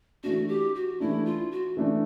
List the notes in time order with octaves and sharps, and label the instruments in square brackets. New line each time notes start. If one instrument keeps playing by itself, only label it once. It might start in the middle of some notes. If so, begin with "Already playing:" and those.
[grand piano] E3 A3 D4 [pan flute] F#4
[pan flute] G4
F#4
[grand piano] E3 A3 D4 [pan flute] E4
[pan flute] F4
F#4
[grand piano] E3 A3 D4